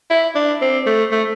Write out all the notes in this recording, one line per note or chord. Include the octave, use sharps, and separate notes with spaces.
E4
D4
C4
A3
A3